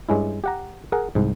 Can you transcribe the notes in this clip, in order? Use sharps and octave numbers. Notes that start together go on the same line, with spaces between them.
G2 G#3 C#4 E4
G4 F#5 A#5
G#4 A#4 F#5
C2 G#2